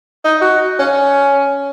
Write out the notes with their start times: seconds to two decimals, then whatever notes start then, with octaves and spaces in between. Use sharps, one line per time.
0.24 D#4
0.41 F#4
0.79 C#4